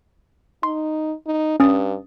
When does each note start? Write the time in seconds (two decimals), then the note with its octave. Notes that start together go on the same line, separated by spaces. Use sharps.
0.63 D#4 C6
1.27 D#4
1.60 G2 C#4 D#6 A6